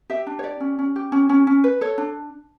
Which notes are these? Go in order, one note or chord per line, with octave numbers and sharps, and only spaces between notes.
G4 E5
D4
C#5
G4 D5
C#4
C#4
G4
C#4
C#4
C#4
B4
A4 C#5
D4